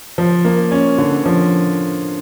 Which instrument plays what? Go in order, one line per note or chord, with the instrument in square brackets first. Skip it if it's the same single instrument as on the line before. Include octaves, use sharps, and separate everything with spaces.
[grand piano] F3
A#3
C#4
D3
F3